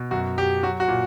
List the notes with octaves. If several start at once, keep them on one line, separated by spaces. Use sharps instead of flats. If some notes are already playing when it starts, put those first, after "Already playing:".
Already playing: B2
F#2 F#4
F#2 G4
F#3 F#4
F#4
A#2